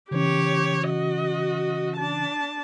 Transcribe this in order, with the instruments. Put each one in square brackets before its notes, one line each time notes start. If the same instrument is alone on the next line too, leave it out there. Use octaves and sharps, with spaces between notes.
[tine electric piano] C#3 E3 C#4 [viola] G4 C#5
[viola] F#4 D#5
D4 A5